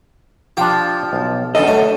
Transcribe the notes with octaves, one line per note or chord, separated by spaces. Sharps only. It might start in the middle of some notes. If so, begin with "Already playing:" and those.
F3 D4 F4 G4
B1
F#2 D3 E3 A4 D#5
A3 C#5